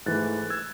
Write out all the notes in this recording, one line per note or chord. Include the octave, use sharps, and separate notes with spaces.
G#2 E3 A3 F#6 A6
E6 G#6